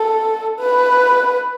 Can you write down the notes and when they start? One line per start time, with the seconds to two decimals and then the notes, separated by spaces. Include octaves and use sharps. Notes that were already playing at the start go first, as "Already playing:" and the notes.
Already playing: A4
0.59 B4